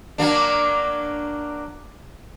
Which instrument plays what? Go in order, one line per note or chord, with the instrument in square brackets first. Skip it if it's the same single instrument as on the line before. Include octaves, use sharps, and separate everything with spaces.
[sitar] F#3 A#3 D4